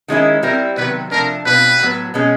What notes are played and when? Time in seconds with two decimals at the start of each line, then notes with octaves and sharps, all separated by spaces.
0.08 D#3 G#3 C#4 E4
0.43 G3 C4 E4 A#4
0.77 C3 D#3 F#3 B3 B4
1.11 C3 F3 A3 D4 A#4
1.45 B2 G3 C4 F4 B4
1.79 A2 F#3 B3
2.14 B2 G#3 C#4